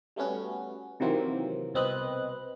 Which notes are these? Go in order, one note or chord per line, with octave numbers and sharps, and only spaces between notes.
G3 A3 B3 C#4 F#4
C3 D#3 E3 F#3 A#3 C4
C2 B2 C4 B4 D#5 F#6